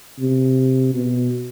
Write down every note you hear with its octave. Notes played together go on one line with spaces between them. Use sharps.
C3
B2